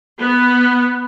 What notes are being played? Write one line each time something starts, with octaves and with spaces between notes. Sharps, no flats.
B3